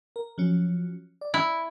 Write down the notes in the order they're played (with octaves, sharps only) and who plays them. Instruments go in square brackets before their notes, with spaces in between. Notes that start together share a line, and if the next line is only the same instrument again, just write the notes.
[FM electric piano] A#4
F3 F#3 C#4
D5
[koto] E4